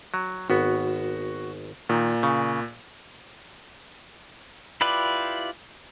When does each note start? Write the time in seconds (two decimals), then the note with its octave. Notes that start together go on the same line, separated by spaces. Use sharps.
0.14 F#3
0.50 G#1 B3 F#4
1.89 A#2 D#3
2.23 C#3
4.81 E4 F4 G4 B4 D5